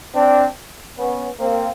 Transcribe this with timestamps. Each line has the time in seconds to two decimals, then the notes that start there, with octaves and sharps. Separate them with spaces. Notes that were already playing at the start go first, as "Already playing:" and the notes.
0.15 C4 D4
0.98 B3 C#4
1.39 A#3 C4